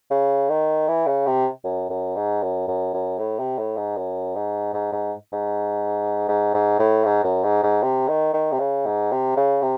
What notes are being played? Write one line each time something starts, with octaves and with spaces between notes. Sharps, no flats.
C#3
D#3
E3
C#3
C3
F#2
F#2
G#2
F#2
F#2
F#2
A2
C3
A2
G#2
F#2
G#2
G#2
G#2
G#2
G#2
G#2
A2
G#2
F#2
G#2
G#2
C3
D#3
D#3
C3
C#3
G#2
C3
C#3
C3